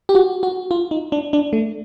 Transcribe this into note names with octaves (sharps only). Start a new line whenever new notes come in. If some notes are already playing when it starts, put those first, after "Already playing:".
G4
F#4
F#4
F4
D#4
D4
D4
A3